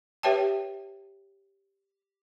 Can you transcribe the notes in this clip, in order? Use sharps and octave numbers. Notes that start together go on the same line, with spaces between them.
G4 B4 C#5 E5 G5 A5